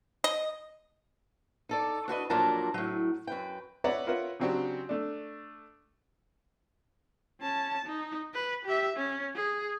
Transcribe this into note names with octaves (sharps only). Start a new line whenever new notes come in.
D#5
D#4 A4 D5
D4 F#4 B4 D#5
F2 A#2 F#3 D4 A#4 A5
A2 F#3
F#2 B4 G5
B4 C#5 D5 E5 F#5 A#5
F4 A#4 B4 C#5 E5 F#5
C#3 F#3 C4 D4 F#4 G4
A3 D4
C#4 A5
D#4
B4
G4 E5
C#4
G#4